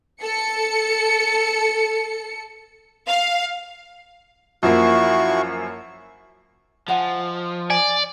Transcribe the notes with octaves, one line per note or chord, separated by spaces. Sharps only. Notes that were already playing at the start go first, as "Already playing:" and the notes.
A4 C#7
F5
F#2 F3 A#3 E4 F#4 C#6
F3 D#5 F#5 G#5
D5 G#5